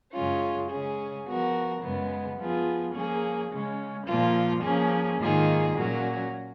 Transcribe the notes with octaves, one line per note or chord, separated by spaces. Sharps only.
F#2 C#3 G#3 C#4 F4
C#3 G#3 C#4 G#4
F3 B3 F#4 A#4
F#2 C#3 G#3 B3
F3 B3 F4 G#4
F3 A#3 C#4 G#4
C#3 G#3 C#4
A#2 F3 A#3 F4
F3 A#3 C#4 G#4
G#2 D#3 A#3 F4 G#4
A#2 F#3 C#4 F#4 A#4